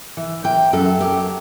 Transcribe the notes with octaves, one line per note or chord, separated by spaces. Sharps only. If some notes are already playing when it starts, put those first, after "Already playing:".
E3
E3 G5
F#2 A4
F#2 G4